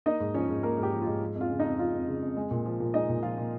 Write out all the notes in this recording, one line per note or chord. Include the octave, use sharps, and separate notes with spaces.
A#3 D#4 D#5
G#2
F3 C#4 C#5
G#2
A#3 A#4
G#2
G4
F3
F4
G#2
F3
F2
F4 F5
C#3
D#4 D#5
F2
F3 F4 F5
F2
C#3
F2
G#3
A#2
F3
A#2
G#3 D#4 D#5
A#2
F3 F4 F5
A#2